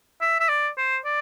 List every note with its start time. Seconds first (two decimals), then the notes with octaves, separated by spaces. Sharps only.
0.21 E5
0.40 E5
0.49 D5
0.77 C5
1.05 D5